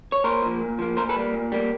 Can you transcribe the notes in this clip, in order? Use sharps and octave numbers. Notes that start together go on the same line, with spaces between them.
C#5
A#2 A#4 C5
F3 A#3
A#2
F3 A#3
A#2 A#4 C5
A4 B4
G3 A#3
A#2
G3 A#3